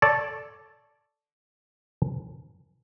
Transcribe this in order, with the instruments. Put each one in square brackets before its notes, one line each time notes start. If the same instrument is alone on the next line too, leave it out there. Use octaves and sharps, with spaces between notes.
[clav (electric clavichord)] A4 C#5 D5